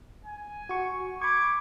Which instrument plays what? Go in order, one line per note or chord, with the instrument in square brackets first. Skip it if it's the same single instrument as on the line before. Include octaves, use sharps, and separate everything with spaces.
[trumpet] G#5
[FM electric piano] F#4 C#6
[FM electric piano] B5 C#6 [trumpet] D6 [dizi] G#6